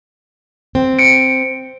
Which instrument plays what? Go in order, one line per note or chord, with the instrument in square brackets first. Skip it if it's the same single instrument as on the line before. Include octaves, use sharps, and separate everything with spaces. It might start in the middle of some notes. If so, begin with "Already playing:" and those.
[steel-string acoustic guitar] C4
[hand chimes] C#7 D7